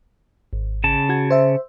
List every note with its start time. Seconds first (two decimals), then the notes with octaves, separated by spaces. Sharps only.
0.53 G#1
0.84 C#3 A5
1.09 F#4 G#6
1.31 C5 E5